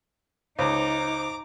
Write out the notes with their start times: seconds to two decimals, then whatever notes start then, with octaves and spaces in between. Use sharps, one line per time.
0.59 C#2 D#4 C5 A#5 D6